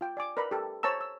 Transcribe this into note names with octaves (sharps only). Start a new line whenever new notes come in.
F4 G5
D5 G#5 D6
A#4 B4 D5 A#5 B5
G4 A4
C5 C#5 A5 A#5 E6
E6